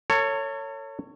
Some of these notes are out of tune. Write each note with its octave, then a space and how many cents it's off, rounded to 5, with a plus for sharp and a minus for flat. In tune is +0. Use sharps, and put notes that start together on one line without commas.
A4 +40 C#5 +0